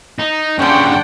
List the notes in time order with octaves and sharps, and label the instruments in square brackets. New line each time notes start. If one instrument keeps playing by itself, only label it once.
[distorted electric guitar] D#4
[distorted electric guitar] G2 C#3 [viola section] D4 F#5 G5 [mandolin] C#5 C6